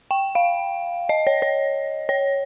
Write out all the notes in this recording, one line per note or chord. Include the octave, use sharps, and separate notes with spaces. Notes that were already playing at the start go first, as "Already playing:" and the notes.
G5
F5
D#5
C#5
C#5
C#5